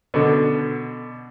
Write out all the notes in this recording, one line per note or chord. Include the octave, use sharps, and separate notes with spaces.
B2 D3